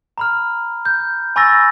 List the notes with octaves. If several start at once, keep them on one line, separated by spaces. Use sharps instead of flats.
A#5 B5 F6
G6
G#5 B5 C#6 E6 A6 A#6